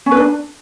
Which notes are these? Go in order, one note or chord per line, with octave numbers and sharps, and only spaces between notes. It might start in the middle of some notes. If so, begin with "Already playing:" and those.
C#4
B4
D4